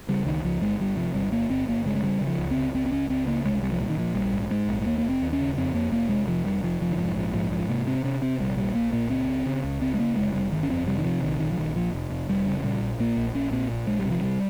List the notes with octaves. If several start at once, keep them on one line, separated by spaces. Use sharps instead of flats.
C#3 G3
C#2 D#3
C#2 F3
G1 G#3
G1 G3
C3 F3
G1 G3
G1 A#3
G1 C4
G1 A#3
C#3 G#3
G#3
C#3 G3
C#3
F3
C#2
C4
C#2
C#2 C4
C4
C#2 C#4
C#2 C4
C#3 A#3
C2 G#3
C2 G3
F3
A#2 G3
D#3
A#2 F3
A#1 G3
G#2
G#2 G#3
A#1
G#3
D#2 A#3
A#3
F1
C4
D#2
C#4
C#3
F2 C4
F2 A#3
F1 A#3
C3 G#3
F1 F3
F1 G3
F1 F3
F1 F3
D#3
G#2 F3
A#1 F3
G#2 F3
G#2 F3
C3 A#3
C3 C4
C3 C#4
C3 C4
A#1 G3
A#2 G3
A#1 A#3
A#2 A#3
C#2 C4
C#3
C#3
C#2
C#3 C4
G#3
C#3 A#3
F1 G#3
F1 G3
G1 D#3
C#4
F2 C4
C3 G3
D#3
C3 F3
A#1 D#3
A#1 D#3
F3
A#1 D#3
A#1 F3
F1
F1
F1 G3
C#3
A#2 G3
A#1
A#2 A#3
A#1
A#1 C#4
A#2 C4
A#1
A#1 G#3
G3
C3 F3
C3 G3